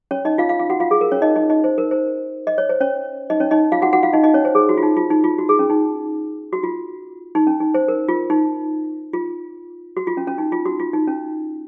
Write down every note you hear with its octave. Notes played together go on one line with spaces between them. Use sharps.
C#4 C#5
D#4 D#5
F4 F5
F4 F5
F4 F5
F#4 F#5
F4 F5
G#4
A#4
C#4 C#5
D#4 D#5
D#4 D#5
D#4 D#5
C5
A#4
C5
D#5
C#5
C5
C#4 C#5
D#4 D#5
C#4 C#5
D#4 D#5
F4 F5
F#4 F#5
F#4 F#5
F4 F5
D#4 D#5
D#4 D#5
C#4 C#5
C5
G#4
F#4
F4
D#4
F4
D#4
F4
F#4
G#4
C#4
D#4
F#4
F4
D#4
C#4
D#4
C5
A#4
F4
D#4
F4
F#4
F4
C#4
C#4
D#4
F4
F#4
F4
D#4
C#4